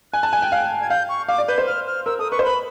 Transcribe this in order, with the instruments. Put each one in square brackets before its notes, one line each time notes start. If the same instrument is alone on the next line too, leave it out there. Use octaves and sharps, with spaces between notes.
[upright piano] G#5 [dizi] F#6
[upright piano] A5
G#5
G5
F5
[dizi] G#6
[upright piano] F5 [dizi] G6
[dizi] C#6
[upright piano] F5 [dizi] D6
[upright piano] D5
[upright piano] B4 [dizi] G6
[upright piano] C5
[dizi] F6
F6
[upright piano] A#4 [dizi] E6
[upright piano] A4 [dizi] D#6
[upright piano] B4 [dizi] C#6
[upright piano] C5
[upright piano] B4 [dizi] B5